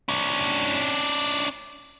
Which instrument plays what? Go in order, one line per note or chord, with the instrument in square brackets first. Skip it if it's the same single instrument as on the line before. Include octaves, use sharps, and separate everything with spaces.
[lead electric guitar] C#4 D4